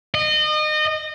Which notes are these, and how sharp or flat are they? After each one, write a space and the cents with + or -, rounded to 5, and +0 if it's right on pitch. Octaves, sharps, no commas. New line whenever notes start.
D#5 -30